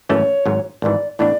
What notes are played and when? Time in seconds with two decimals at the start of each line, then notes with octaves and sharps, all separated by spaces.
0.09 G#1 F#2 E3 A3 C#4 C#5
0.46 G#1 G#2 F#3
0.82 G#1 G#2 E3 D5
1.19 A2 E3 B3 D4 D5